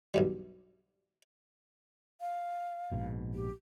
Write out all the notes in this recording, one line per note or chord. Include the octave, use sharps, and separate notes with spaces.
B1 G2 G3
F5
A#1 G#2 B2
G4